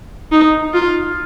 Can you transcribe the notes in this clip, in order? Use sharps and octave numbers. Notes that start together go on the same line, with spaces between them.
D#4
F4